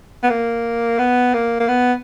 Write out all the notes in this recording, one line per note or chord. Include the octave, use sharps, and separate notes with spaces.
B3
A#3
B3
A#3
A#3
B3